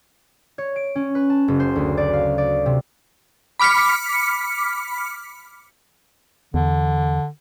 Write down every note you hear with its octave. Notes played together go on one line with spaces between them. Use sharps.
C#5
D7
C#4
B4
A5
F#1
C5
D2
D5
F5
D5
C3
B5 D6 F6 B6 C#7
E2 D3